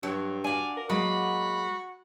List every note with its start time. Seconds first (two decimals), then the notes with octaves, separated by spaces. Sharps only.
0.03 G2 F#3
0.44 D4 F#4 D5 F5 G#5
0.77 A#4
0.90 F#3 G#3 A#3 F#4 D#5 B5